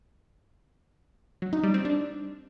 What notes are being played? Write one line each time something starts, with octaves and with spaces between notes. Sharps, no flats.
F#3
D#4
G3
C4
D4